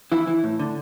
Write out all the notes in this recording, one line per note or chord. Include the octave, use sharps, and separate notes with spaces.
E3 E4
E3
A2
D3